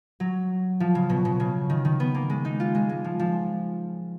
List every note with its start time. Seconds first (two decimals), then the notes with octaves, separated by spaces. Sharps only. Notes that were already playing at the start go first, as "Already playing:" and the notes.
0.20 F#3
0.80 F3
0.95 C#3
1.10 B2
1.25 B2
1.40 C#3
1.70 D#3
1.85 D#3
2.00 B3
2.15 A#3
2.30 G#3
2.45 D#4
2.60 F4
2.75 G#3
2.89 G#3
3.04 F3
3.19 F3